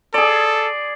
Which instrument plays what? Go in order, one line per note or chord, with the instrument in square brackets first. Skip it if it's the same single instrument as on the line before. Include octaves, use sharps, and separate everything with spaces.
[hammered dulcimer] G#4 D5 [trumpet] A4